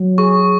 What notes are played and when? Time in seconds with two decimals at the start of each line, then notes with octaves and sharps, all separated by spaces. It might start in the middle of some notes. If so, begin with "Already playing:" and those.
Already playing: F#3
0.18 G#4 C#6